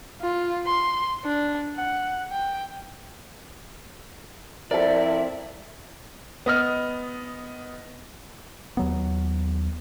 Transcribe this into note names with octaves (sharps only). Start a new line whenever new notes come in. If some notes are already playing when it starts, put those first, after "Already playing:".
F4
C6
D4
F#5
G5
F3 C4 E4 A4 A#4 D5 E5
B3 D#5 F6
D#2 F#3 B3